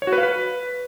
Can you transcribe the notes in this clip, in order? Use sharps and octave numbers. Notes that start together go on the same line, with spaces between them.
C#5
F#4
B4
F5
B4